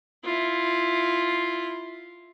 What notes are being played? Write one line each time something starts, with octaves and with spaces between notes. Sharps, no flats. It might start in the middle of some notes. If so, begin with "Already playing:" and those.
E4 F4